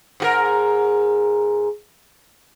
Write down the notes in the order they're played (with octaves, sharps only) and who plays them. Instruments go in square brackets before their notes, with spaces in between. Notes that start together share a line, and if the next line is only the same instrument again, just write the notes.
[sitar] G#2 F#4 A#4